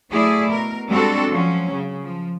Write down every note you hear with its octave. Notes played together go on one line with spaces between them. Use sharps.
F#3 A3 E4 G#4 D5
B2 A#4
G3 G#3 C4 D4 F#4 A4
F3 F#3 C#4
C#3
F3